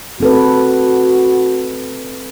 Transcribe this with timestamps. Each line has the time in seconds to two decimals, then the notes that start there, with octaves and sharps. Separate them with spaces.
0.20 C4 F#4 A4 B4